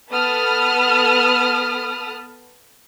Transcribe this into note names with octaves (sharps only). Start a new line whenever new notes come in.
B3 A4 A5 B5 D#6 F6